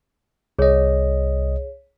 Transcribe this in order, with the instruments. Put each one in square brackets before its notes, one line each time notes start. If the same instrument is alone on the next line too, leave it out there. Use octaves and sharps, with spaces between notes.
[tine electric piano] C2 D#5 [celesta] G#4 C#5